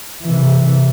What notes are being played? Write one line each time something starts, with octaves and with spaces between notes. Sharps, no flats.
C3 E3